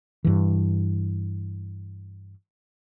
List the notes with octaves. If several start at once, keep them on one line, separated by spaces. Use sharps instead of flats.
G2 E3